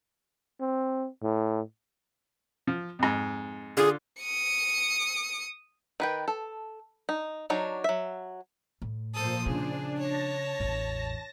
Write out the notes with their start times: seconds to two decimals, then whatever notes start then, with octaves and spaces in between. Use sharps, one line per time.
0.61 C4
1.22 A2
2.67 F3
2.99 F2 G#2
3.77 D3 F4 G#4
4.21 D#6 C#7
6.00 D#3 B4 G5
6.28 A4
7.09 D#4
7.50 F#3 D4 D#4 C#5
7.84 F#3 E5
8.82 A2
9.14 A#2 F3 A4 C5 D#6
9.46 C#3 D4 G#4
9.99 C#5 A5 A#6
10.60 A1 E2